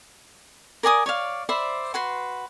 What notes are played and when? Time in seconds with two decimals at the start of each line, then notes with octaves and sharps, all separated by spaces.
0.83 A#4 D5 G#5 D#6
1.06 C#5 D5 F5
1.49 C5 D5 E5 B5
1.94 F#4 B4 C6